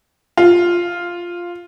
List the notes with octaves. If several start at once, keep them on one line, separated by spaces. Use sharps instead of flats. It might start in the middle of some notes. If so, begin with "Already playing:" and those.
F4